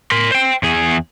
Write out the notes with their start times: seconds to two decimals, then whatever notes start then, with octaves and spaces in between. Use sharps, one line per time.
0.11 A#4 C6
0.31 C5 G5
0.63 E2 G#4